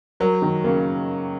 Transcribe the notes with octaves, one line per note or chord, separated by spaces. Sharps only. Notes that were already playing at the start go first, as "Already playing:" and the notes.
F#3 A#4
D#3
C#3 A#3